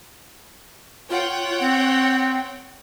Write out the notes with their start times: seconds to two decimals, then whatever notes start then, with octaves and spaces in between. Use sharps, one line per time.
1.10 F4 C#5 F#5 G5
1.60 C4